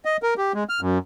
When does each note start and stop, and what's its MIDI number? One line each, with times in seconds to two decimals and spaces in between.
0.05 0.17 75
0.23 0.34 70
0.37 0.52 67
0.54 0.64 56
0.69 0.81 89
0.81 0.98 42